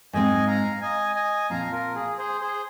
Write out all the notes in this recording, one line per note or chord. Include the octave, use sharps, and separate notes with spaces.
G#2 G#3 C4 D#5 G#5
F5 A#5
D#5 G#5
D#5 G#5
A#2 F3 C4 F5 A#5
F4 A#4
G#4
G#4 C5
G#4 C5